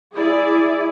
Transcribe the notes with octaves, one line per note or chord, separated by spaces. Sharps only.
E4 G#4 D5